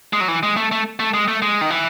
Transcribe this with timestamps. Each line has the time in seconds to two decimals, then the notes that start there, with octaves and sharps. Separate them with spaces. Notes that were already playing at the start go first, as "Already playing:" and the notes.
0.13 G#3
0.20 F#3
0.28 E3
0.43 G#3
0.57 A3
0.71 A3
0.99 A3
1.14 G#3
1.28 A3
1.42 G#3
1.61 D#3
1.70 E3